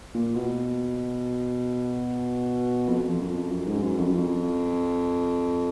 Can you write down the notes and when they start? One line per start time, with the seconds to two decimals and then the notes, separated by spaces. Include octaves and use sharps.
0.14 A#2
0.35 B2
2.89 F2
3.09 F2
3.21 F#2
3.30 F2
3.51 F#2
3.67 G#2
3.83 F#2
3.99 F2
4.09 F#2
4.15 F2